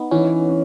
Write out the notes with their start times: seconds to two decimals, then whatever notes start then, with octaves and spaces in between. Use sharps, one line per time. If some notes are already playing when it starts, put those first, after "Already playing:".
Already playing: B3 D#4
0.11 E3 C#4
0.49 C#4